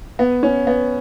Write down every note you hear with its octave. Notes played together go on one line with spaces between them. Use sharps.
B3
C#4
B3